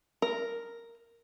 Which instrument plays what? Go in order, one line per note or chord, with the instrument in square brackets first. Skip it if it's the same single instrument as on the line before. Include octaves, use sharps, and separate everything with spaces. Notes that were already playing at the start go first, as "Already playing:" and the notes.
[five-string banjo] A#4